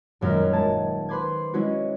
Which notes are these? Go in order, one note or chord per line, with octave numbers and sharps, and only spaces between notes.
D#1 F#2 G#3 A#4 E5
G#3 A5 G#6
B4 C5 B5 C6 D6 G#6
G#3 C#4 E4 F#4